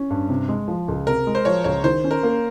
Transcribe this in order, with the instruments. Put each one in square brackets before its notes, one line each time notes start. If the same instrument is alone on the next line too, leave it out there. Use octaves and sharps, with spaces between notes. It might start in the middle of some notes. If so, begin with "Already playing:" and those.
Already playing: [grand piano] C#4
G2
C3
G#3
F3
C#2
[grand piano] C3 [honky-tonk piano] A#4
[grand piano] G#3
[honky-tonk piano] C5
[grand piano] F3 [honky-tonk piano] C#5
[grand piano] C#2 [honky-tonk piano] C#5
[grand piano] D#3 [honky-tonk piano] C5
[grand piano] C#4
[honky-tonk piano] A#4
[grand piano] A#3